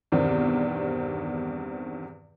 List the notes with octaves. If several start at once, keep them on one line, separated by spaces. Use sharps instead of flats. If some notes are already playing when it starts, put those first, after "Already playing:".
E2 G2 B2 D#3 G3 C4